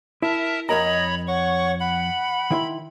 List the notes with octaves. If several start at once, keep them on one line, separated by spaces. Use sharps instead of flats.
E4 A#4 E5 A5
F2 A#4 C#5 D#5 A#5 B5
C#5 F#5 C#6
F#5 B5
D#3 E4 C6